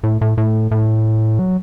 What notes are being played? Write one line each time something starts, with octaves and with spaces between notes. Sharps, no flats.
A2
A2
A2
A2
F#3